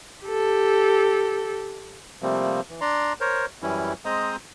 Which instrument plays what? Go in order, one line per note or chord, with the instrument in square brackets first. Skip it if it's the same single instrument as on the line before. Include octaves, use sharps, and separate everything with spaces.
[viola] G4 A4
[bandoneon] C3 F3 G3 A3 A#3 C4
E3
D4 D5 A#5 C6
A#4 C5 C#5
F#2 E3 G3 C#4 E4
G#3 C4 C5 D#5 A#5 D#6